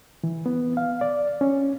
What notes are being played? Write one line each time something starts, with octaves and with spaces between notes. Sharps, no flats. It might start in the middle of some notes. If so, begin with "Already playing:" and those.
E3
B3
F5
D5
C#4